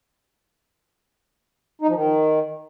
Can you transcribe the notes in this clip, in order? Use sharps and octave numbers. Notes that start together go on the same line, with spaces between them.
D#4
F3
D#3